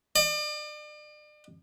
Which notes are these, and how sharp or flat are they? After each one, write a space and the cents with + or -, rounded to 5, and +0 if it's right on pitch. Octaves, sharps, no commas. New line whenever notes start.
D5 +40